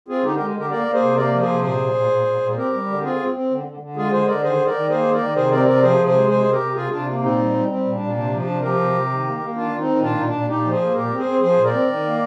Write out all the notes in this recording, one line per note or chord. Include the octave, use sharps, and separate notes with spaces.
C4 F4 G#4
D3 D#4 G4
G#3 G4 A#4
D3 G4 A#4
A#3 A#4 D5
A#3
G#4 C5
C3
A#3 A#4 D5
F3 A#4
G#4 C5
C3
A#2 G#4 C5
A#2
A#2
A#2
A#2
A#2
C4 G4 A#4
G3
D3
C4 F4 G#4
C4
C4
D3
D3
D3
G#3 F4 G#4
D3 G#4 C5
D3 A#4 D5
D#3 G#4 C5
D#3
A#4 D5
D#3
A#3 G#4 C5
D#3
A#4 D5
D#3
C3 G#4 C5
C4 A#4 D5
C3 A#4 D5
F3 G#4 C5
C3
G#4 C5
G#3
C3 G#4 C5
C3
G4 A#4
C3
C3 F4 G#4
C3 D4 F4
A#3
A#2 C4 D#4
G3
G3
G3 C4
A#2
D4
A#2
C3 D4
F3
D4
C3
F3 G4 A#4
C3
C3
D#3
A#3
A#3
D#3 D4 F4
D#3
C4 D#4
D#3
A#2 D4 F4
A#2 D#4
D4
A#2
A#2 D#4 G4
F3
G#4 C5
A#3
A#2 G4 A#4
C4
G#4 C5
C4
F3 G#4 C5
A#2
A#4 D5
C4
D#3
A#3